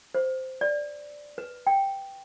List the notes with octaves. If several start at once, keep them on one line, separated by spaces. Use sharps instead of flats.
C5
D5
B4
G5